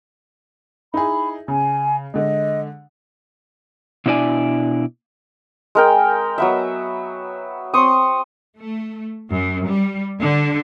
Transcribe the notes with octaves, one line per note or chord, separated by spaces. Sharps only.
D#4 E4 G#4 B5
C#3 G#5
D3 G#3 D#5
B2 D4 E4 D5 G#5
G#3 A#4 G5
F#3 B3 E5
C4 C6 C#6 D#6
A3
F#2
G3
D3